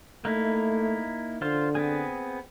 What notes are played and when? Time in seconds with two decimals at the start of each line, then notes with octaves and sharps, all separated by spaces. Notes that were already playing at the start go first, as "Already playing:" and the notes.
0.25 A3 A#3 D#4 E4
1.42 D3 F4 C5 C6
1.75 B3 C4 G#4